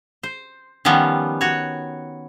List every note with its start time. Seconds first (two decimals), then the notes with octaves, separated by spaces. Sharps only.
0.23 C5
0.85 D#3 F3 G3 B3 C#4
1.41 F#4 C#5